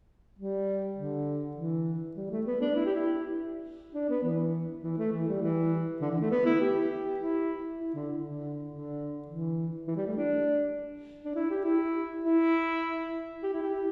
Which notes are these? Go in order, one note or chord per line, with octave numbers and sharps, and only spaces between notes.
G3
D3
E3
G3
A3
B3
D4
E4
G4
E4
D4
B3
E3
E3
A3
E3
G3
E3
D3
E3
A3
B3
E4
G4
E4
E4
D3
D3
D3
E3
E3
G3
A3
D4
D4
E4
G4
E4
E4
G4
E4
G4